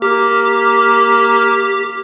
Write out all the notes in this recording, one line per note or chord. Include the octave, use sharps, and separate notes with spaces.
A#3 G4